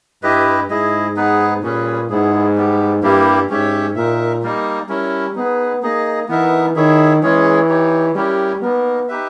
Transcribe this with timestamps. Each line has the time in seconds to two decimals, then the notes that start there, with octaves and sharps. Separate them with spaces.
0.23 G2 E4 G4 B4 D#5
0.70 G#2 E4 G#4 D#5
1.16 B3 D#4 G#4 B4
1.62 A#2 G3 C#4 G#4 B4
2.10 G#2 B3 E4 G#4
2.56 G3 B3 G4
3.02 G2 G3 A#3 E4 G4
3.49 G#2 C#4 G4 C#5 E5
3.96 A#2 D#4 A#4 E5
4.42 G3 A#3 D#4
4.88 G3 C#4 E4 A#4
5.35 B3 D#4 G#4 B4
5.83 A#3 D#4 G#4 D#5
6.28 E3 B3 D#4 A#4 E5
6.76 D#3 E4 G#4 C#5 E5
7.22 E3 G#3 C#4 G#4 C#5
7.69 D#4 G4 C#5
8.15 G3 C#4 E4 G4 A#4
8.62 A#3 B3 D#4 A#4
9.09 D#4 G4 B4 E5